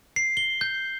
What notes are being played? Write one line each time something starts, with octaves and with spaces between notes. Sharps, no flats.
C7
G7
G6